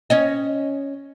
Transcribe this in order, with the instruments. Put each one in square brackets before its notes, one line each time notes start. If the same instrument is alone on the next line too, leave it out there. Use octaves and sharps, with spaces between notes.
[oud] C#4 C#5 D#5